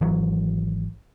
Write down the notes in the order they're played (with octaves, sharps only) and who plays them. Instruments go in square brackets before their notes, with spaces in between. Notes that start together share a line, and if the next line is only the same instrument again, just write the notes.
[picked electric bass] G#1 E3 F#3